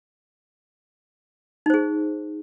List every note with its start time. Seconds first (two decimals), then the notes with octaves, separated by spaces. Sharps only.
1.66 D#4
1.70 C5
1.74 G#4